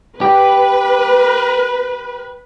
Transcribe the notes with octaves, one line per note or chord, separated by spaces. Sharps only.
G4 B4